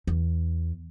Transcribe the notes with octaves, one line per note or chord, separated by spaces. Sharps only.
E2